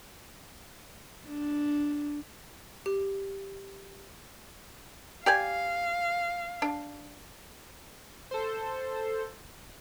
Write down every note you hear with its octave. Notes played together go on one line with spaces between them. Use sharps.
D4
G4
G4 D5 F5 G#5
D4
A4 C5